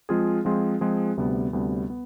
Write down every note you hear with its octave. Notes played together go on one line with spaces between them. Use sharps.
F3 G#3 C4 F4 G#4
F3 G#3 C4 F4 G#4
F3 G#3 C4 F4 G#4
D2 C3 G3 B3
D2 C3 G3 B3
B3